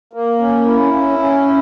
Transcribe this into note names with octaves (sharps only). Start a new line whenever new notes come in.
A#3
C#4
E4
C#4
C#4
E4